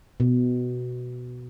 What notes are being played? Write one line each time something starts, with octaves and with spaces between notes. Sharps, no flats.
B2